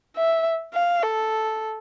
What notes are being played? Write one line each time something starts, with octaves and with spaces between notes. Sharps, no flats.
E5
F5
A4